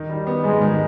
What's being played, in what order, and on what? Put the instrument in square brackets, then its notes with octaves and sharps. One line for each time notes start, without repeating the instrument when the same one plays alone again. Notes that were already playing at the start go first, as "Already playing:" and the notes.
Already playing: [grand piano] D#3 D#4
G3
B3
[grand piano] G#2 [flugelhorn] G#3
[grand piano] D#3